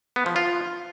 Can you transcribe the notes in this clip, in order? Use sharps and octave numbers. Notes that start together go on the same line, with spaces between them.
B3
F3
F4